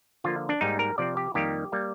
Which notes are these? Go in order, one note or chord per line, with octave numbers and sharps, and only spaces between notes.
D3 F3 A#3 F4
D4
G#2 G3 A#3 D#4
A#4
C3 F3 C4 D5
G4
F2 D#3 G3 A#3 G4
G3 A#3